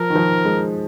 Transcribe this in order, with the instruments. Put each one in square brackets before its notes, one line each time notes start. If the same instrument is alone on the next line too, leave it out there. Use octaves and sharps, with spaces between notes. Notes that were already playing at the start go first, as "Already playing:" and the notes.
Already playing: [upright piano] F3 [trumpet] A#4
[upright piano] D#3
F3
G#3